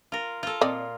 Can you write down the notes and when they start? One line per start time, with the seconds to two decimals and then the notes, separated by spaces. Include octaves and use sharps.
0.12 F4 A#4
0.43 F4 A4
0.61 A#2 C4 D5 D#5